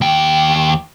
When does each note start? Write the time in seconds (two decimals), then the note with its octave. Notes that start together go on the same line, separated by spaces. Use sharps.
0.01 D#2 G5